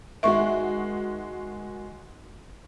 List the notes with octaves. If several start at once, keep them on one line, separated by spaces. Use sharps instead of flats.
D#3 G#3 F#4 E5 C#6